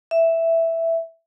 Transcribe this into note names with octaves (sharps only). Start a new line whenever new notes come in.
E5